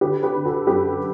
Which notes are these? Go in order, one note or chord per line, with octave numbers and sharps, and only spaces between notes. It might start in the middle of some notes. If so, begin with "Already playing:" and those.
D3 G4 B4
G4 B4
D3
F#4 A4
F#2 G4 B4